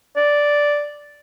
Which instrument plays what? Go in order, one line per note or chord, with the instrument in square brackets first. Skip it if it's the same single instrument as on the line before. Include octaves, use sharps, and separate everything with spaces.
[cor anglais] D5